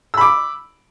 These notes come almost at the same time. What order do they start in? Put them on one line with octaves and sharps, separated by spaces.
E6 B5 D6